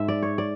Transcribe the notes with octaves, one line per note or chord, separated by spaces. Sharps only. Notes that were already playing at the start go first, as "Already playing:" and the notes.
Already playing: G#2 G#3 E5
D5
C#5
D5